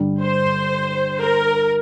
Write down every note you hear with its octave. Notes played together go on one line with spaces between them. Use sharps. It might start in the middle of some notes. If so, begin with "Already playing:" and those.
Already playing: G2 D3 G3
C5
A#4